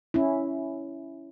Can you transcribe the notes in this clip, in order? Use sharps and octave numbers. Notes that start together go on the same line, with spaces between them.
C#4 E4